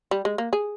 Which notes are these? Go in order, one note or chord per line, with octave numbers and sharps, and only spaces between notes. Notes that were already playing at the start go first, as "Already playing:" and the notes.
G3
G#3
A#3
G#4